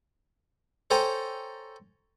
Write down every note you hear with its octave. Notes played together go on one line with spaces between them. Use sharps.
A4 C5 C#5 G5 G#5 A#5